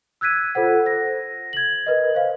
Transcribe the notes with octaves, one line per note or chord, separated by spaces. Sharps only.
E6 F#6 G#6 B6 D#7
F4 A4 C5 F#5
A#6
G#6 F#7
A#4 B4 D#5
C5 F5